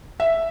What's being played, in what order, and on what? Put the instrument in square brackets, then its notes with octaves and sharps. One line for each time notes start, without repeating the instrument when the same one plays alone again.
[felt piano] E5